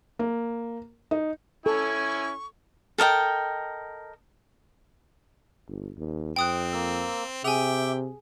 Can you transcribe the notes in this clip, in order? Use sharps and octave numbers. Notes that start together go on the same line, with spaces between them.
A#3
D#4
C#4 E4 A4 G#5 C#6
A4 A#4 D#5 G5
G1
D#2
F2 C4 G5 D#6 F#6
A#3 E6
C3 G#4 E5 G5 G#5 D6